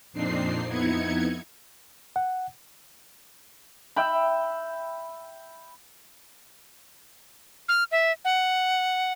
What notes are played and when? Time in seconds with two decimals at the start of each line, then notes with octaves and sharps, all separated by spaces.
0.13 F2 A#2 C4 D4 D#4 C7
0.67 F2 B3 D#4 E4 G#6 C#7
2.16 F#5
3.96 E5 G5 B5
7.69 F6
7.92 E5
8.25 F#5